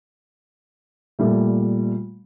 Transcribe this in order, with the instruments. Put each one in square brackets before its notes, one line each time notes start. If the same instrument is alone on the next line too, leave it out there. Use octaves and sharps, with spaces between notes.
[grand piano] A#2 G3 A3